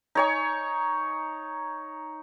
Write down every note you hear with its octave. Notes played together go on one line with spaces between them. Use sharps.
D#4 C#5 G#5